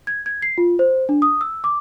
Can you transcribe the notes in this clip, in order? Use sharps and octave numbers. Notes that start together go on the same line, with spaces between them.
G#6
G#6
C7
F4
C5
D4
D#6
E6
D6